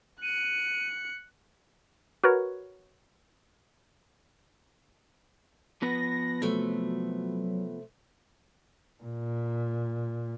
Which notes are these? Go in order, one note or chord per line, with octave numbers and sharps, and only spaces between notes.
F#6 C#7 D#7
F#4 A#4 B4 C#5
F3 B3 B4 A#6
C3 F#3 A3
A#2